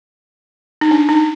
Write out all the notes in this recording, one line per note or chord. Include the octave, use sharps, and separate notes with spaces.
D#4
D4
D#4